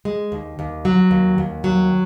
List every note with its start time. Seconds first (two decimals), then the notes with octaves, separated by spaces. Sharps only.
0.05 G#3
0.32 D#2
0.59 D#2
0.85 F#3
1.11 D#2
1.38 D#2
1.64 F#3